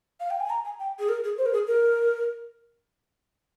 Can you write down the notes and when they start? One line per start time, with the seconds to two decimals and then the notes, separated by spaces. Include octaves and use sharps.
0.20 F5
0.30 G5
0.40 G#5
0.50 A#5
0.65 G#5
0.79 G5
0.99 G#4
1.09 A#4
1.24 G#4
1.38 C5
1.46 A#4
1.53 G#4
1.67 A#4